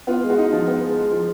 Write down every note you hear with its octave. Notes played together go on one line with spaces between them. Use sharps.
B3 F4
G#3
F#4
D#4
F3 F4
B3
G#3
G#3
F3